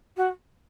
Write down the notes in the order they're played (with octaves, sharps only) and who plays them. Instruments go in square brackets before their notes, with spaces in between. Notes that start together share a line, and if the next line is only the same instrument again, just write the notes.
[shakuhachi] F#4